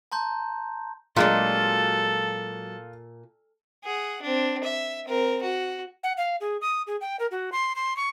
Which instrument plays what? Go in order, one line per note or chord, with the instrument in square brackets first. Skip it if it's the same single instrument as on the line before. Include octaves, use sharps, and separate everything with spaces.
[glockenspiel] A5 A#5 C6 G6
[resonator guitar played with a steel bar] A#2 [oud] F#3 G#3 D4 [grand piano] F4 [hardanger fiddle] A4
[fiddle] G#4 F#5
C4 D4
E5
C4 A#4
F#4
[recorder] F#5
F5
G#4
D#6
G#4
G5
A#4
F#4
C6
C6
C#6